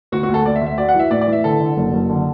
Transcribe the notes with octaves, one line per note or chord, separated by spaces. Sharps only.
D2 F#4
F#4
D2
A4
D2 D5
E5
D2
E5
F#4 D5
F#5
E3
E5
A2 D5
D5
E3
E5
D3 A4
D3
F#1
F#1
D3